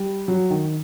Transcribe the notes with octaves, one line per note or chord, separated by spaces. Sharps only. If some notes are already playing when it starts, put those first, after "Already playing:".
Already playing: G3
F#3
D#3